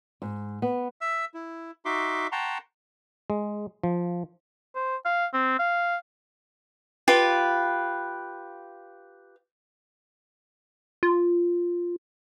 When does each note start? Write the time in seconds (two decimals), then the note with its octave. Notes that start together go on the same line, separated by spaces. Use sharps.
0.22 G#2
0.62 B3
1.01 E5 E6
1.34 E4
1.85 D#4 F#4 E5 C6 D6
2.32 F#5 G5 A5 A#5 C6 C#6
3.30 G#3
3.84 F3
4.75 C5
5.06 F5
5.33 C4
5.59 F5
7.08 F4 G4 B4
11.03 F4